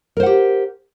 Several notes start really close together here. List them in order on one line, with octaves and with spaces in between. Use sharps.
A#4 C5 F#5 G4